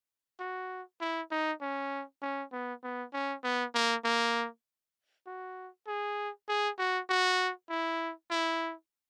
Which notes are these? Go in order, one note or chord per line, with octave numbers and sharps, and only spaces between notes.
F#4
E4
D#4
C#4
C#4
B3
B3
C#4
B3
A#3
A#3
F#4
G#4
G#4
F#4
F#4
E4
E4